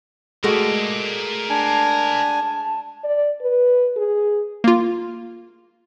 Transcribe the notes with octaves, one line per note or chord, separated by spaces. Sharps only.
G#3 A3 F#4 A#4 D5
D4 G#5 A5
D5
B4
G#4
A#3 F4